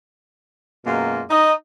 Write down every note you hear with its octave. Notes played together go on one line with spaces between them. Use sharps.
F#2 B2 G#3 A#3 F4
D#4 D#5